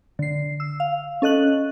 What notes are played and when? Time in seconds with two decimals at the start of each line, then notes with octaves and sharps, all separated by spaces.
0.19 D3 C7
0.60 E6
0.80 F5
1.22 C#4 A4 D#5 F#6 F#7